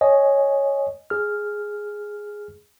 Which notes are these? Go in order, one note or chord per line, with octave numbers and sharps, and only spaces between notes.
C#5 D#5 G#5
G#4 F6